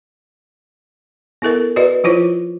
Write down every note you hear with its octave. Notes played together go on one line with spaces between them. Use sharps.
B3 E4 A4 A#4
F#4 B4 D5 D#5
F3 E4 F4 C5 C#5